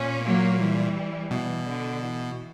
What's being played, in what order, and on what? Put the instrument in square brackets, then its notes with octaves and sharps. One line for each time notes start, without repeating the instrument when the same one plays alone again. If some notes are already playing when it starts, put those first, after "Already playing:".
Already playing: [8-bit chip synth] A#2 [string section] C#4
[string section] F#3 A#3
E3 G3
[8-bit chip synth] B2 [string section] E3
[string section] D3
E3